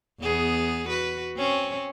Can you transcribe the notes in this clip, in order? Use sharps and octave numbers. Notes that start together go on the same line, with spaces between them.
E2 B3 G#4
F#4 B4
C4 C#4